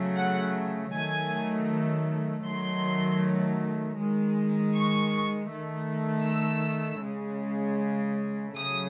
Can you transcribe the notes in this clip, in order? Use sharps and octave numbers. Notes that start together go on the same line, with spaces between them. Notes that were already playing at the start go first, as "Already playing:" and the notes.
Already playing: C#3 F#3 A3
F#5
D#3 F#3 A3 G#5
D#3 F#3 A3 C6
D#3 G#3
C#6
D#3 A3
E6
C#3 G#3
C#3 F#3 A3 D#6